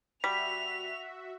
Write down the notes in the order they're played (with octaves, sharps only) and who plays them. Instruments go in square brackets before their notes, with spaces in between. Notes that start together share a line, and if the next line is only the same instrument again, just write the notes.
[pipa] G3 [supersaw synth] F#4 E5 [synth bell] B6 [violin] F7